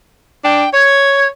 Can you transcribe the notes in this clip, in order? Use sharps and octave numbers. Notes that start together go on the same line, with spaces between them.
D4 G5
C#5 G#6